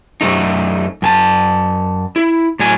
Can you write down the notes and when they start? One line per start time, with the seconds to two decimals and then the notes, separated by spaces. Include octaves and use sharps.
0.21 F#2 C#3 A3 D#4
1.02 F#2 G#5 A5
2.16 E4
2.59 A2 F#3 G#5